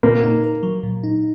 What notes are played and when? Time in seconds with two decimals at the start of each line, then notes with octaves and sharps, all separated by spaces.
0.03 A#2 A#3
0.23 D#4
0.44 A#4
0.63 F#3
0.83 A#2
1.03 D#4